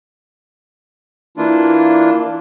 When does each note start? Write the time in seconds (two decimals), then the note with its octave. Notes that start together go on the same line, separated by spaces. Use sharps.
1.37 E3 A#3 D4 E4 F4